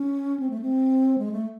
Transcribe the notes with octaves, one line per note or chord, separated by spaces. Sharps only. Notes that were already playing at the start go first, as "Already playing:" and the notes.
Already playing: C#4
C4
A3
C4
G#3
A3